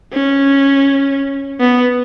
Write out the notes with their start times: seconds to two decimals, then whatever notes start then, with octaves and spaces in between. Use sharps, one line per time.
0.13 C#4
1.60 B3